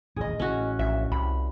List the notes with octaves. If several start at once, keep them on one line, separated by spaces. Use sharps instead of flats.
D#1 A1 F2 G#4 D#5
A1 C#4 F#4
A#1 E5
C2 B5